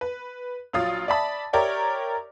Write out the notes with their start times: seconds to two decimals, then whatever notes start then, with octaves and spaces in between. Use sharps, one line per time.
0.01 B4
0.73 A#1 F#3 F4 F5 D#6 A6
1.08 D5 E5 A5 B5
1.53 G4 A#4 C#5 D5 E5 G5